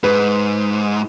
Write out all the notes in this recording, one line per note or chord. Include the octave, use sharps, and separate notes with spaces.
G#2 B4